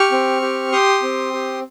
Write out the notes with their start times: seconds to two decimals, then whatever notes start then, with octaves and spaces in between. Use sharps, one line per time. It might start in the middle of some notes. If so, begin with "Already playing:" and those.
Already playing: G4 C#6 F6
0.12 C4
0.42 G4
0.72 G4 C6 D#6
1.03 C4
1.33 G4